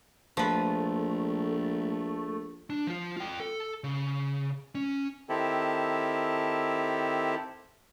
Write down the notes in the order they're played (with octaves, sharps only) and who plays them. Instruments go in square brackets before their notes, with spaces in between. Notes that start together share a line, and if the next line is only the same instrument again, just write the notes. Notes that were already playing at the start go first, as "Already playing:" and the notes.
[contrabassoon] A#1 [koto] F3 B4 [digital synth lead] A3
[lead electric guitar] D4
F3 F4
F4 G5
A4
C#3
C#4
[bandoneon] D#3 C4 E4 G4 A4